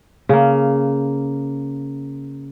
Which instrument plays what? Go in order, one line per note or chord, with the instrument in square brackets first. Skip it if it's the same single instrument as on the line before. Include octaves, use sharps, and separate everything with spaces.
[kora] C#3 A#3